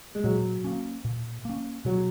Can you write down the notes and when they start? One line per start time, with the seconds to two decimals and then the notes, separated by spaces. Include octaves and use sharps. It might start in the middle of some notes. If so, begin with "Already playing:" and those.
0.15 G#3
0.24 A#2 F#3
0.64 A#3 C#4
1.05 A#2
1.45 A#3 C#4
1.85 B2 F#3